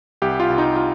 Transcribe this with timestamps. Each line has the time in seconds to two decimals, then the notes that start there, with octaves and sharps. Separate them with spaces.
0.22 C2 G4
0.40 F4
0.50 C2
0.58 D#4
0.76 F4